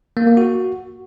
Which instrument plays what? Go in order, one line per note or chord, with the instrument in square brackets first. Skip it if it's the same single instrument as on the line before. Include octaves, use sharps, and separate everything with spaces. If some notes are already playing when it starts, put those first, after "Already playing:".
[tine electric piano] A#3
A#3
F#4